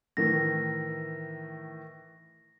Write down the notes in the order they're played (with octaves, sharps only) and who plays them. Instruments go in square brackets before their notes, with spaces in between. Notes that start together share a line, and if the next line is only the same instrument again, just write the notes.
[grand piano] A2 D#3 E3 [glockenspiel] A#6